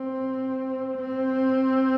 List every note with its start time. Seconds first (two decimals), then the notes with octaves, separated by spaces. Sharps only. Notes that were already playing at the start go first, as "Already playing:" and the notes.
Already playing: C4
0.99 C4